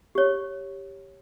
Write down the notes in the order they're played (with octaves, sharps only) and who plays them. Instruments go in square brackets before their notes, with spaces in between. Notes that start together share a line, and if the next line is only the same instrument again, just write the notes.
[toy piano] G4 C#5